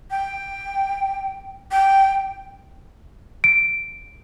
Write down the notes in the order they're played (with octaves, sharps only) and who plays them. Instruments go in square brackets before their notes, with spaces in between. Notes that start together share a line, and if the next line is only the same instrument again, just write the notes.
[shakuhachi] G5
G5
[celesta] D7